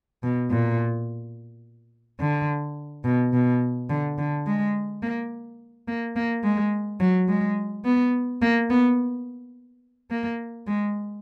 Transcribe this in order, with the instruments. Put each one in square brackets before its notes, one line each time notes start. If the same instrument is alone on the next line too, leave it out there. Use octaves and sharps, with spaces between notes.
[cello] B2
A#2
D3
B2
B2
D3
D3
G#3
A#3
A#3
A#3
G#3
F#3
G#3
B3
A#3
B3
A#3
G#3